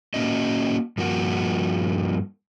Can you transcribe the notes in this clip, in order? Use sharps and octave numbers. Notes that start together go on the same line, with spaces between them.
A#3 C#4 F#4 D#5
G2 F3 A#3 F#4